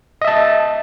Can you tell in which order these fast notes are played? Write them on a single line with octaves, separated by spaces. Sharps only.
D#5 E5 A5